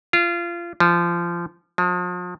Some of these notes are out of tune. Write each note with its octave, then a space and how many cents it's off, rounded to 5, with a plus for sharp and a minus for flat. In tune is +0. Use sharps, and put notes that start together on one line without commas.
F4 -25
F3 -20
F3 +40